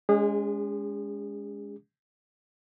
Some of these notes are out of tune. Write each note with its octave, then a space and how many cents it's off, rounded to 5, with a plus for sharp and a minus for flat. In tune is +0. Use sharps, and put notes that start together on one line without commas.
G#3 +0 C#4 +40 G#4 -35